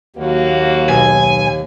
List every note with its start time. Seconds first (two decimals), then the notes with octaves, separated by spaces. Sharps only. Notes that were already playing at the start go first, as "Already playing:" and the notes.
0.16 D#2 F#3 A#3 F#4
0.89 B1 G#5